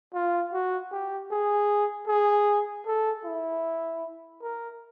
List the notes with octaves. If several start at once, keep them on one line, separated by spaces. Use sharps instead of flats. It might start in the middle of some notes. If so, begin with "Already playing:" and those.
F4
F#4
G4
G#4
G#4
A4
E4
A#4